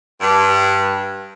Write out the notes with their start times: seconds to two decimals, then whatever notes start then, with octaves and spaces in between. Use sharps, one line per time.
0.21 G2